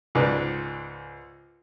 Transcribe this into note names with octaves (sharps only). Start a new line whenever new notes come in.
C#2 G#2 B4 D5